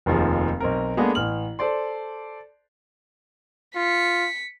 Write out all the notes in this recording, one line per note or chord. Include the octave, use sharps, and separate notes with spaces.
F1 D#2 F3 G#4
B1 C4 A#4
G#3 A#3 B3 D4 G#4 A4
A1 F6 F#7
A4 C5 D5 C6
F4 B6 C#7